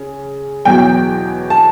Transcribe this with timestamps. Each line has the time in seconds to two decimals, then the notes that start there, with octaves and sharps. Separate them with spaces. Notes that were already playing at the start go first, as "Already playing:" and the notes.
Already playing: C#3
0.65 E2 B2 F#3 G5
1.50 A5